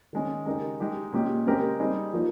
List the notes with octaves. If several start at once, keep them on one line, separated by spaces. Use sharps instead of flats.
D#3 G#3 C#4
C#3 G#3 D#4 G4 A#4
G#3 D#4 G4
A#2 G#3 C#4 G4
C#3 G#3 C4 G4 A#4
G3 C4 D#4 G#4
F3 A#3 D#4